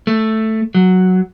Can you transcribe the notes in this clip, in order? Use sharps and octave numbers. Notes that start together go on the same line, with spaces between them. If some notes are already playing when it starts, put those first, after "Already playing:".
A3
F#3